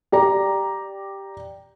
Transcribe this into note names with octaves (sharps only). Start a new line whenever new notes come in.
G4 D5 A#5